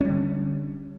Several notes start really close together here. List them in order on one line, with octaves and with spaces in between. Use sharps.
C#4 G3 D3